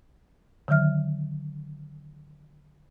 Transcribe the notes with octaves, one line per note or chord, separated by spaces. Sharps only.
D3 D#3 F#3 E5 F6